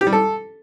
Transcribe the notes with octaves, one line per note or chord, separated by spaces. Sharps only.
G4
G3
A4